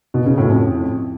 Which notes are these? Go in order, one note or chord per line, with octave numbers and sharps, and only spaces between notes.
B2
C#3
A2
F2